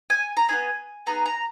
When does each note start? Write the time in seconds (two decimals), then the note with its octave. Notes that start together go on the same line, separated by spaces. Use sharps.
0.10 G#5
0.37 A#5
0.48 B3 D#4 G#4 G#5
1.06 B3 D#4 G#4 A#5
1.26 A#5